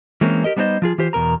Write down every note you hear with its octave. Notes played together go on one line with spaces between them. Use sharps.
E3 G#3 A#3 C4 C#4
G4 A#4 D#5
G3 B3 D4 D#4 C5 D#5
F3 F4 G#4
E3 F4 G4 C5
E2 B2 A#4 A#5